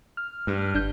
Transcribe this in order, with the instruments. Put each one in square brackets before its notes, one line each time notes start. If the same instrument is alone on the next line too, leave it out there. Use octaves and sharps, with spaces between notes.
[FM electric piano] F6
[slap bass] G2
[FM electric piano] G1 D4 G6